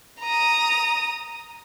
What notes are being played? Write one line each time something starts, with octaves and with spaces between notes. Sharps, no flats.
A#5 D#6